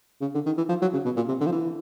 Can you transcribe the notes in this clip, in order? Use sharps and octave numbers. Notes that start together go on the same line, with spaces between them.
C#3
D3
D#3
E3
F3
F#3
C#3
B2
A#2
C3
D3
F3
E3